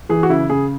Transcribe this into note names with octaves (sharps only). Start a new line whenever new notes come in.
E3 G#4
F#4
C#3 E4
C#3 G#4